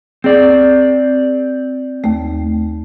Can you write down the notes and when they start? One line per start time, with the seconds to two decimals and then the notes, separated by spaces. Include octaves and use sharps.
0.24 C4 G#4 D5
2.04 D#2 A3